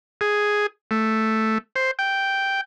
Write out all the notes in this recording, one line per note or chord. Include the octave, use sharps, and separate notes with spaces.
G#4
A3
C5
G5